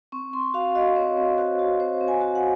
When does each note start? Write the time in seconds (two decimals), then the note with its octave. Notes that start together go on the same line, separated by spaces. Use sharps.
0.12 C4 C#6
0.33 C4 C6
0.54 F#4 F5
0.75 F#4 D#5
0.96 C4 C#5
1.17 C4
1.38 F#4 C5
1.59 F#4
1.80 C4 C5
2.01 C4
2.08 G#5
2.21 F#4
2.35 F#5